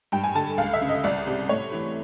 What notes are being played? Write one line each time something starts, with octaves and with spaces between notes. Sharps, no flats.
G2 G5
G#5
D3 A5
C#2 F5
E5
C#3
D#5
C2 D5
C3
A2 C#5
E3